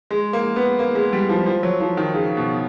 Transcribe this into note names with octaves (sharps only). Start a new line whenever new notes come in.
G#3
A#3
B3
A#3
G#3
G3
F3
F3
F#3
F3
D#3
C#3
B2